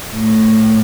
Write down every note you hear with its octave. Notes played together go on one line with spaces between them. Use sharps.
A2